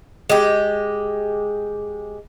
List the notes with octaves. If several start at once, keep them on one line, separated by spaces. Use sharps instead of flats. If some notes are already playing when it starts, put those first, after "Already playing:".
G#3 G4